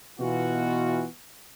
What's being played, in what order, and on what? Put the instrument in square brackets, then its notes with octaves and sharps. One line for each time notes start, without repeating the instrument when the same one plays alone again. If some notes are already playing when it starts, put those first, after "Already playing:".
[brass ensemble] B2 E3 F4 F#4